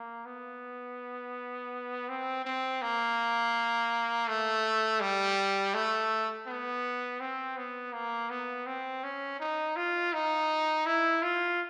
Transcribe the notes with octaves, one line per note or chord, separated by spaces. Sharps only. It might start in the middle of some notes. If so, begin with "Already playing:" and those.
Already playing: A#3
B3
C4
C4
A#3
A3
G3
A3
B3
C4
B3
A#3
B3
C4
C#4
D#4
F4
D#4
E4
F4